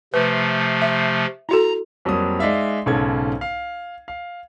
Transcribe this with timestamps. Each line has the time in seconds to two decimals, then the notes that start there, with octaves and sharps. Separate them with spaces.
0.14 C3 F3 A3 B4
0.82 E5
1.49 E4 F#4 A4 A#5
2.05 F2 F#3 G3 A#3 D#6
2.39 G#3 D#4 D5 E5 F5
2.86 B1 G#2 C#3 A4 G#6
3.41 F5
4.08 F5